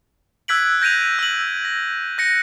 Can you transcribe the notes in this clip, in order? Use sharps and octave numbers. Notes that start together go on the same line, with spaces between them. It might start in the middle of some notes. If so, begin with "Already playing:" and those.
E6 F#6 G#6 B6 D7 F#7
G6 A#6 D7 D#7 F7
E6 F#7
A#6
F#6 A#6 C#7